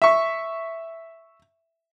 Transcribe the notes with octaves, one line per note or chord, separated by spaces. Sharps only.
E5 C#6